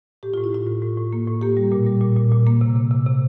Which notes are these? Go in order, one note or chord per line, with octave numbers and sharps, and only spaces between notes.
A2 G4
A2 F4
E4
A2 F4
A2
A2
A2
A#3
A2
A#3 G4
G3
A#2
G3
A#2
A#2
A#2
A#3
C3
C3
C3
C3